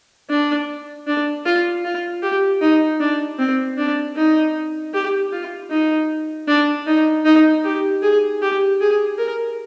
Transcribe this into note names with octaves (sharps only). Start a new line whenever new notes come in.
D4
D4
F4
F4
G4
D#4
D4
C4
D4
D#4
G4
F4
D#4
D4
D#4
D#4
G4
G#4
G4
G#4
A#4